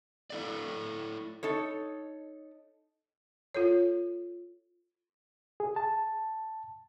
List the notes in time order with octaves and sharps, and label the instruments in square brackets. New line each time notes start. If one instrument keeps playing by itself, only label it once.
[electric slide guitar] E4 A4 D5
[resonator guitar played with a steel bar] D#4 A4 C#5
[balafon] F4 A4 C#5
[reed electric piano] G#4
A5